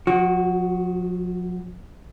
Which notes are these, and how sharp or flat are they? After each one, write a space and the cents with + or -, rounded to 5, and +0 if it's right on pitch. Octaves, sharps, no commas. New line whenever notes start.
F3 +45 F#4 +0